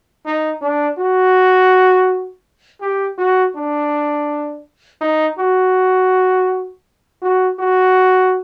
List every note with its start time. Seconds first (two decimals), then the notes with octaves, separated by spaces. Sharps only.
0.25 D#4
0.62 D4
0.98 F#4
2.81 G4
3.18 F#4
3.56 D4
5.01 D#4
5.38 F#4
7.22 F#4
7.59 F#4